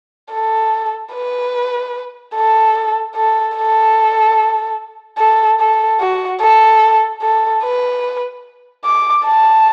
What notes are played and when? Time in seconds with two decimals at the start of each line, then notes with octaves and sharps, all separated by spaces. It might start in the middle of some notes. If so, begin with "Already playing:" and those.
0.33 A4
1.14 B4
2.35 A4
3.16 A4
3.57 A4
5.19 A4
5.60 A4
6.00 F#4
6.41 A4
7.22 A4
7.63 B4
8.85 D6
9.25 A5